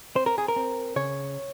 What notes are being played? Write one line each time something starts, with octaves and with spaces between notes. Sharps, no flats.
C4 C5
A#4
G#4
A#4
C4
C#3 C#5